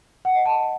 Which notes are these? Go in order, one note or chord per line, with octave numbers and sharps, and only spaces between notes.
F#5
D#5
A5